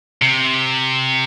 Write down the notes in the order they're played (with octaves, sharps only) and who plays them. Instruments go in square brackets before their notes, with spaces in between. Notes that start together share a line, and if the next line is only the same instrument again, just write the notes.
[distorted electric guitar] C3